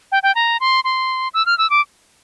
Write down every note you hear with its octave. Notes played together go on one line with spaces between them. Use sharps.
G5
G5
A#5
C6
C6
E6
F6
E6
D6